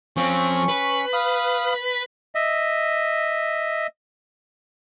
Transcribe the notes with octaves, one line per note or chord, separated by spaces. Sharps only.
F3 C4 C#4 C#6
B4
F5 B5 D#6
D#5 E5